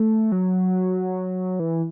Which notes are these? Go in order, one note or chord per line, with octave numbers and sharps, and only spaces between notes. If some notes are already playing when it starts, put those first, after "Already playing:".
Already playing: A3
F#3
E3